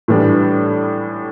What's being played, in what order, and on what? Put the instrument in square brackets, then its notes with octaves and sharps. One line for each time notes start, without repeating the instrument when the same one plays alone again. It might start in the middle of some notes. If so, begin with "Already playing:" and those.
[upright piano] A2 E3 G3 D4